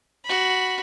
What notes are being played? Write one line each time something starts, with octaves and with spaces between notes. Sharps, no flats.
F#4 B5